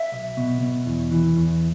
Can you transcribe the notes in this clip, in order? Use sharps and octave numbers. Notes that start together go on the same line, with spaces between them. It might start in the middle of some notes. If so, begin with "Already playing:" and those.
Already playing: E5
B1
B2
B2
E2
E3
E2